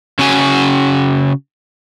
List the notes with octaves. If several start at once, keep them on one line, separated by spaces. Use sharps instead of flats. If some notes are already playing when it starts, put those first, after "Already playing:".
C#3 C#4 F#4 G#5